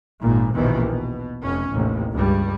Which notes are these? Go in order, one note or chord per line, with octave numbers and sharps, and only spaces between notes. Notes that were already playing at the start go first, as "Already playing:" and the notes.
G#1 A#2
A#1 D#2 B2 D#3 E3
B2
F1 C#4
A1 D#2 C3
C#2 G2 G3